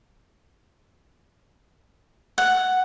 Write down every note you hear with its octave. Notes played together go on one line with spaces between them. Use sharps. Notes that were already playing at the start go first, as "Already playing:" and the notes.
F#5